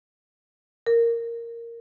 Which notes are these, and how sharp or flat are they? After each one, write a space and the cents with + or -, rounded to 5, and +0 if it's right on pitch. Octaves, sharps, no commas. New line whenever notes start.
A#4 -5